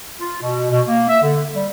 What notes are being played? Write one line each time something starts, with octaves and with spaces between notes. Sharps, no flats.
F4
B2
B2
A#3
E5
D3
G3